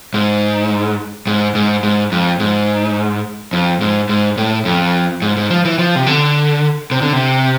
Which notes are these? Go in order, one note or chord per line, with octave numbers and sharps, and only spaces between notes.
G#2
G#2
G#2
G#2
F2
G#2
F2
G#2
G#2
A2
F2
G#2
G#2
F3
E3
F3
C3
D3
C3
D3
C3